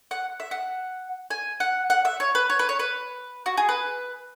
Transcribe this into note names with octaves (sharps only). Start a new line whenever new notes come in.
F#5
E5
F#5
G#5
F#5
F#5
E5
C#5
B4
C#5
B4
C#5
B4
F#4
G#4
B4